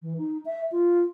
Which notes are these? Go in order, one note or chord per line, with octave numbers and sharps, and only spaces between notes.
E3
D#4
E5
F4